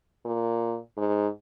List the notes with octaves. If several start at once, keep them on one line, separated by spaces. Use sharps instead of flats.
A#2
G#2